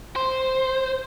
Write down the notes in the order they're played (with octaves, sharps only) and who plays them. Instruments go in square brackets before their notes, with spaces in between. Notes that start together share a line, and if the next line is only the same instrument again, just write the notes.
[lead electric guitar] C5